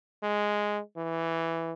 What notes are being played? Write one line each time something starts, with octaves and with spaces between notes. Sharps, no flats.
G#3
E3